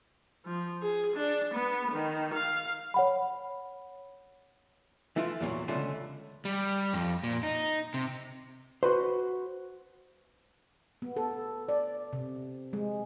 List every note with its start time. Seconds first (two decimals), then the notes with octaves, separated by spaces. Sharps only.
0.46 F3
0.82 G#4
1.16 D4
1.54 B3
1.91 D#3
2.34 F5
2.94 C#5 F#5 B5
5.16 E3 A3 E4 F4
5.41 E2 A#2 E3 F#3
5.68 C#2 D3 A3 F4 G#5
6.45 G3
6.94 F2
7.23 A#2
7.43 D#4
7.94 C3
8.83 F#4 B4 C5
11.02 B3
11.17 A4
11.69 D5
12.13 C3
12.73 G#3